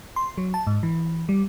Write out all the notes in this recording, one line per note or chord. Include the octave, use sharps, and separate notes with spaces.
C6
F#3
A5
G#2
E3
G3